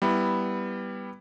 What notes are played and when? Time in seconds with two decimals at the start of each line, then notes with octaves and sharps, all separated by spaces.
0.02 G3 B3 E4